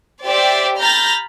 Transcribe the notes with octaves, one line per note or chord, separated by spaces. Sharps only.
G4 C5 D5 E5
A#5 B5 F6 G6 A6 A#6